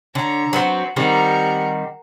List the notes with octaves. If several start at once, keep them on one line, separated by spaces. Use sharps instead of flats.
D3 C#5 A#5
F#3 B3 C4 F#4
D#3 G3 C4 A#4 F#5